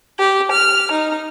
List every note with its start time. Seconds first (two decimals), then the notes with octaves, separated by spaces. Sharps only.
0.18 G4
0.52 F6
0.92 D#4